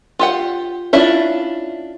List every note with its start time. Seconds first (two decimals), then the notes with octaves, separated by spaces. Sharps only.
0.19 F4 G4 F#5
0.93 C#4 D4 E4 F4